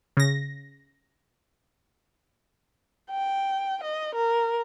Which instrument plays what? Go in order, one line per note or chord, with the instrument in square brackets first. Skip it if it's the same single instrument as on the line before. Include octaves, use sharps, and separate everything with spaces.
[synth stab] C#3 A#6
[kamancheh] G5
D#5
A#4